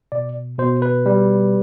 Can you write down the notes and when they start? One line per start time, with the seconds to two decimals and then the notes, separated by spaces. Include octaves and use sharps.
0.12 B2 D5
0.58 B2 C5
0.82 B4
1.06 G3